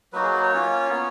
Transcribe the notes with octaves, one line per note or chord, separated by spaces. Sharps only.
F#3 A#3 D#4 F#4 B4
G#4
B4
C#5
A#3 C#4 F4
B3 F4